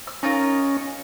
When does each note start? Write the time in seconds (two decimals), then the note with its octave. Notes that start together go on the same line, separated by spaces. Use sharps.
0.07 F6
0.23 C#4 D#4 F4 A#4